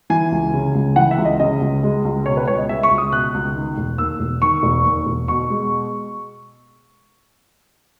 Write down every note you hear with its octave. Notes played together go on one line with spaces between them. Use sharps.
E3 G#5
C#2
C#3
C#2
E3 F#5
E5
C#2
D#5
C#3 D#5
C#2
G#3
C#2
B2 C#5
B4
C#2 C#5
D#5
G#3 E5
C#6
C#2
D#6
B2 F#6
C#2
D#3
E1
D#2 E6
E1
D#3 C#6
E1
D#2
E1
B2 C#6
G#3